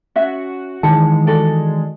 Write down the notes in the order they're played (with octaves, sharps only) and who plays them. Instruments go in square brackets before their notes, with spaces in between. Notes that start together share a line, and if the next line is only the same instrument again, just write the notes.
[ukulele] C#4 E5 [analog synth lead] F#4
[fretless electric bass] D#3 E3 [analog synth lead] G#3 [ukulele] F#5 A5
[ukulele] F#4 A4 D5